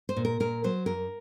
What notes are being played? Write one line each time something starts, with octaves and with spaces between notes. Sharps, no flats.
C5
A#2
A#4
A#2 A#4
F#3 C5
F#2 A#4